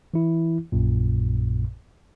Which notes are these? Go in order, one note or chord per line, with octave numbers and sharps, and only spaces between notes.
E3 E4
A#1 F#2 A#2